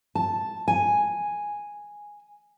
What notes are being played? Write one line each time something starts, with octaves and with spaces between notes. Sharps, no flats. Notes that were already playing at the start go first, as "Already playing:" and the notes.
A5
G#5